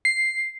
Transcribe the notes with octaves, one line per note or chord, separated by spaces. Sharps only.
C7